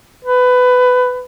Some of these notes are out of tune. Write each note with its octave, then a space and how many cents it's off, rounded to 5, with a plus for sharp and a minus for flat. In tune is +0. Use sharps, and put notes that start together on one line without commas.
B4 +20